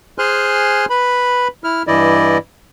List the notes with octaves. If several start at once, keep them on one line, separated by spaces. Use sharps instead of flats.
G#4 C5 G#5 C6 F6 F#6
B4 B5
E4 F6
G2 E3 E4 D5 D#5